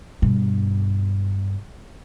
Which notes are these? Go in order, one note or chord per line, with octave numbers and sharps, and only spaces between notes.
G2 B2